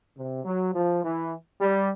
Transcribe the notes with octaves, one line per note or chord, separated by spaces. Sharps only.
C3
F#3
F3
E3
G3